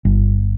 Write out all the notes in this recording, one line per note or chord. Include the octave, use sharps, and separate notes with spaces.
G1